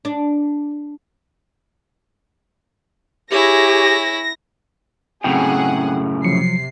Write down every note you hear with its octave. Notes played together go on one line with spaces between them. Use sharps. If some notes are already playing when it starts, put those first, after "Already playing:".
D4
E4 G4 G#4 C#5 A#6
F#2 A2 C#3 C4 G#4 F#5 G5
C3 F3 F#3 C7 C#7